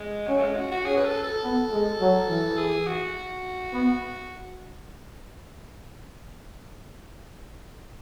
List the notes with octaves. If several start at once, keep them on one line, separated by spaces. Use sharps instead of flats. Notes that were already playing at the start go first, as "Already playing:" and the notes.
Already playing: G#3
F#3 C#4
A3
G#3
F#4
F#4
C#4 G#4
B4
A4
A4
B3
G#3
F#3
E3
G#4
F#4
B3